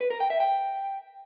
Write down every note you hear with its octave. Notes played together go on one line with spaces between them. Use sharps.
B4
A#4
G5
E5
G5